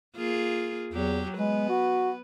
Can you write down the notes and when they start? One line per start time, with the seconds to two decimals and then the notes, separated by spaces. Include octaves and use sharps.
0.16 A#3 F4 G#4
0.93 E2 F#3 G4
1.38 G#3 B3 B4
1.69 F#4